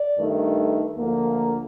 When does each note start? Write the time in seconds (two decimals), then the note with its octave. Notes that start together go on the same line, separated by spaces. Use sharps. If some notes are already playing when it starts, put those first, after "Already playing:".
Already playing: D5
0.18 G2 D#3 A3
0.97 D2 D3 F3 A#3